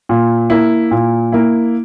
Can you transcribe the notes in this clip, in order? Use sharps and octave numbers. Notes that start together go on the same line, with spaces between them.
A#2
A#3 E4
A#2
A#3 E4